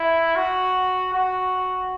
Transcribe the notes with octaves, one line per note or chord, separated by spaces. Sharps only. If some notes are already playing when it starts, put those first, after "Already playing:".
Already playing: E4
F#4
F#4